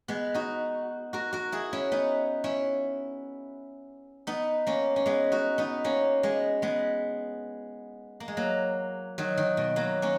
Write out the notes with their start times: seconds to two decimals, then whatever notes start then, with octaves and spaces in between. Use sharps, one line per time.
0.08 G#3 B3
0.34 D#4 F#4
1.13 F#4 A#4
1.33 F#4 A#4
1.52 E4 G#4
1.73 C#4 E4
1.92 B3 D#4
2.44 C#4 E4
4.27 B3 D#4
4.67 A#3 C#4
4.96 C#4
5.06 G#3 B3
5.32 D#4 F#4
5.58 B3 D#4
5.84 A#3 C#4
6.23 G#3 B3
6.62 G#3 B3
8.20 A#3
8.28 G#3
8.37 F#3 A#3
9.18 D#3 F#3
9.37 D#3
9.57 B2
9.76 F#3 A#3
10.02 A#3 C#4